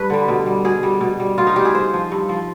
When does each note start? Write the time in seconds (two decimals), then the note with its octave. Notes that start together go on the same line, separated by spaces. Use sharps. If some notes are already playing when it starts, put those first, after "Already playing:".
Already playing: G2 B4
0.10 D3 G3
0.28 B2
0.46 G3
0.65 B2 G#4
0.83 G3
1.01 B2
1.20 G3
1.38 B2 F4
1.47 D#4
1.56 G3 G4
1.65 G#4
1.74 G2 C5
1.94 F3
2.12 G2
2.29 F3